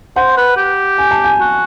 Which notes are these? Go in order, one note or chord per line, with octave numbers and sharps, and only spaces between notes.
C5 F#5
B4
G4
G#5
A5
G#5
F#4